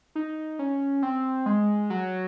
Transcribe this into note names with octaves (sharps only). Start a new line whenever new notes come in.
D#4
C#4
C4
G#3
F#3